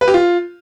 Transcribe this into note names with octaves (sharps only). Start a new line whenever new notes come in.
B4
G4
F4